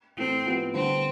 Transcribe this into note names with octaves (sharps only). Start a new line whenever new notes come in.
A2 E3 A3 C4 E4
A2 F3 B3 E4 G4
D3 G3 B3 C4 D4